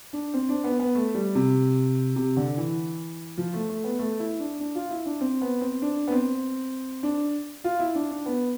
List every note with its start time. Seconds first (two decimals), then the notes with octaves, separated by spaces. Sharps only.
0.13 D4
0.34 C4
0.49 D4
0.64 B3
0.79 B3
0.95 A3
1.14 G3
1.35 C3
2.16 C3
2.37 D3
2.57 E3
3.38 F3
3.54 A3
3.69 A3
3.84 B3
3.99 A3
4.20 E4
4.40 D4
4.60 D4
4.75 F4
4.90 E4
5.06 D4
5.21 C4
5.41 B3
5.61 C4
5.82 D4
6.08 B3
6.12 C4
7.03 D4
7.64 F4
7.79 E4
7.95 D4
8.11 D4
8.26 B3